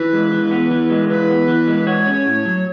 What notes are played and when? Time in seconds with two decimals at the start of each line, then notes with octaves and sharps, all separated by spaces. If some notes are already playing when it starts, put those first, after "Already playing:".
Already playing: E3 B4
0.13 G#3
0.32 E3
0.51 B3
0.70 E3
0.90 G#3
1.09 E3 B4
1.29 B3
1.48 E3
1.68 G#3
1.87 F#4 C#5
2.06 C#4
2.25 A2
2.45 F#3